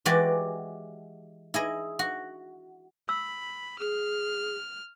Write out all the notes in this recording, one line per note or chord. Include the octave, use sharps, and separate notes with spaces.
E3 G#3 F#4 G4 D5
E4 G#4 D#5
F#4
B5 E6
G#4 F6